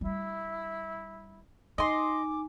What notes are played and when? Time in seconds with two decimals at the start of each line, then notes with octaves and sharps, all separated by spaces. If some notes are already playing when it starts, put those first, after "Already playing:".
0.01 G3 D4 E4
1.78 C#4 D#4 D#5 G#5 C6 D6